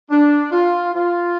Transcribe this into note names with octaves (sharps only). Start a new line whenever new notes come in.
D4
F4
F4